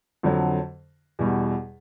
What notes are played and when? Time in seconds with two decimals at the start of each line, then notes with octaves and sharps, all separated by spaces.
0.23 F2 D3 F#3
1.19 E2 B2 G3